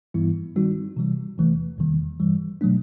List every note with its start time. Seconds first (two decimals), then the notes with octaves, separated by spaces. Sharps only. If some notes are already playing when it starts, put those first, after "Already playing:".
0.14 G2 E3 G3 B3 E4
0.56 D#3 G3 C4 D#4 F#4
0.97 C3 E3 G3
1.38 E2 C3 E3 A3
1.78 E2 C3 D#3 G3 A#3
2.20 G2 E3 G3
2.61 B2 F#3 A3 D4